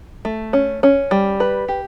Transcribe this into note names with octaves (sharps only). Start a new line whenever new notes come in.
A3
C#4
C#4
G3
B4
G4